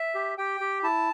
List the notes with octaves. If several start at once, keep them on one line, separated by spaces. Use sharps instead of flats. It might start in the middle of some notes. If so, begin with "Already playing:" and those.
Already playing: E5
G4
G4 G5
G4
E4 A5